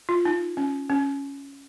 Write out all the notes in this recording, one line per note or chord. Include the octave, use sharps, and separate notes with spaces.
F4
D#4
C#4
C#4